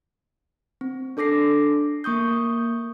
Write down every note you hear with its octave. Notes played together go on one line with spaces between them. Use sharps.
C4
D4 A4 D6 A#6 C7
A#3 C#6 D#6 G6